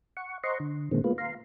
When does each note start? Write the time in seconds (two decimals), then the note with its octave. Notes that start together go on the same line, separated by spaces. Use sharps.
0.17 F#5 C#6
0.44 C5 D#5 F#5 A#5 C6 C#6
0.60 D3
0.91 A#2 D3 D#3 G#3 A#3 C4
1.04 G#3 A#3 B3 F4 B4
1.18 F5 A#5 C6